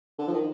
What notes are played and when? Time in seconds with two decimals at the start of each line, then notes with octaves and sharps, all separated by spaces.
0.19 D3
0.27 F3
0.34 D#3